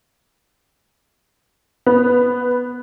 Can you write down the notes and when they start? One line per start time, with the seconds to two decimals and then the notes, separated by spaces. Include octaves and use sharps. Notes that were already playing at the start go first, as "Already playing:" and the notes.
1.86 B3